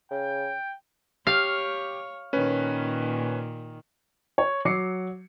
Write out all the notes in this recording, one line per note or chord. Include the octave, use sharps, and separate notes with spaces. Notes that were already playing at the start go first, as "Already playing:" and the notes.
C#3 G5
G4 C#5 F5 F6
A#2 D#3 C#4 B4
C#5
F#3 D6 C7 C#7